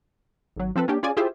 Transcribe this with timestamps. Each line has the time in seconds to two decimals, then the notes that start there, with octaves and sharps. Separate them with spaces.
0.57 G#1 F#3
0.76 F3 C4 A4 B4
0.88 A#3 C#4 D4 G4
1.03 C#4 F4 G#4 D5 G#5
1.17 E4 F4 G4 G#4 C5 E5